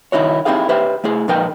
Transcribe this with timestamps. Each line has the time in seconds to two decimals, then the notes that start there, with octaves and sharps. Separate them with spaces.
0.12 D#3 D#4 E4 F#4 C#5
0.45 C4 D#4 E4 G4 G#4 F5
0.69 G4 B4 C5 E5
1.04 A3 E4 G#4
1.28 A#2 F3 D#4 A#4 B4 G5